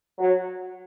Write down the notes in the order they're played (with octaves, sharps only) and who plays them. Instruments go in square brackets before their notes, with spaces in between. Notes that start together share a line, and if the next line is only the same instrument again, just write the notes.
[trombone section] F#3